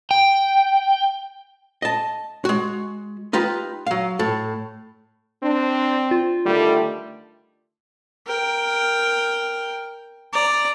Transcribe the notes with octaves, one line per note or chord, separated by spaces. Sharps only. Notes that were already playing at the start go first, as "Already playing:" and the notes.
G5
D#5 A5
G#3 F#4
D#4 F4 G4 B4
F#3 F5
A2 A4
C4 D4
F4
D3 D#3 G3 A3
A#4 G5
D5 A#5